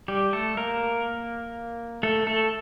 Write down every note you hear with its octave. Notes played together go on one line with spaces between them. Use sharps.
G3 G4
A3 A4
A#3 A#4
A3 A4
A3 A4